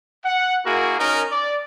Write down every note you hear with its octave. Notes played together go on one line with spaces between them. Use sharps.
F#5
A#3 E4 F#4 G#4 A#4
C#4 D#4 A#4
D5